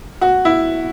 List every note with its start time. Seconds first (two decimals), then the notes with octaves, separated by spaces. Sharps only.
0.21 F#4
0.45 E4